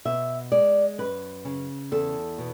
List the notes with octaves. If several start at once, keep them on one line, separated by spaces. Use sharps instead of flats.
B2 E5
G#3 D5
F#2 B4
C#3
E2 A4
B2